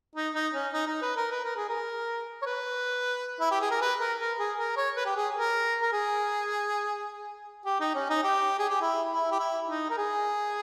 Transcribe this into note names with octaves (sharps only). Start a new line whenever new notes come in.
D#4
D#4
C#4
D#4
D#4
B4
A#4
B4
A#4
G#4
A#4
C#5
B4
E4
G4
G#4
A#4
B4
A#4
A#4
G#4
A#4
C#5
B4
G4
G#4
A#4
A#4
G#4
G4
D#4
C#4
D#4
G4
G#4
G4
E4
E4
G4
E4
D#4
A#4
G#4